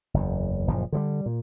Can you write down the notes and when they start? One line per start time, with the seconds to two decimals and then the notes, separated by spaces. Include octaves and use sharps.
0.14 F#1 E2
0.67 F#1 A#2 F3
0.92 D3 F3 G3
1.26 A#2